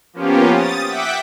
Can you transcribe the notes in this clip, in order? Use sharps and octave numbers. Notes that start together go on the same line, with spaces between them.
F3 A#3 B3 C#4 F4 G4
D#6 A6
E5 F#5 G5 D6 B6